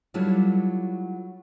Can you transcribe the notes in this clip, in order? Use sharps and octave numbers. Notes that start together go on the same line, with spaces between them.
F#3 G3 A3 D4 E4 F4